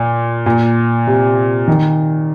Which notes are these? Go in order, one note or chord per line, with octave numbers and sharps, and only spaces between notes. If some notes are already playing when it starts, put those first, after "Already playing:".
Already playing: A#2
A#2
C3
D#3